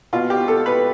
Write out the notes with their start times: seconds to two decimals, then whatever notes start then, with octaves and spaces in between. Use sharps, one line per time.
0.13 B2 F4
0.30 G4
0.48 A4
0.66 B4